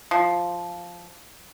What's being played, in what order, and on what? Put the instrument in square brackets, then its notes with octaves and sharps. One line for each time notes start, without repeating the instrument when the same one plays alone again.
[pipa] F3